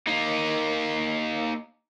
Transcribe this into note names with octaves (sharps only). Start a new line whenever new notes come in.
A#3 D#4